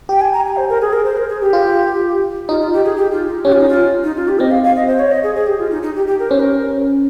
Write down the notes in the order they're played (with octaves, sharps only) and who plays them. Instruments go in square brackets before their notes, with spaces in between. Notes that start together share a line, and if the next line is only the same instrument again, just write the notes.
[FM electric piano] G4 [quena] G5
[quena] G#5
A#5
G#5
C5
A#4
G#4
A#4
C5
A#4
G#4
G4
[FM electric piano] F4
[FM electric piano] D#4 [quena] F4
[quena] F4
G4
G#4
G4
F4
D#4
[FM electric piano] C#4 [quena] G4
[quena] F4
D#4
F4
D#4
F4
G4
[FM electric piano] C4 [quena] D#5
[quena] F5
F5
D#5
C5
C#5
D#5
G#4
G#4
G4
F4
D#4
D#4
G4
G4
A#4
[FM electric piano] C#4 [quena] C5
[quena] A#4